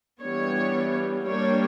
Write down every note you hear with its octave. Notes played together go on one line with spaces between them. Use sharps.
E3 G3 B3 D4 C#5
G3 A#3 D4 C#5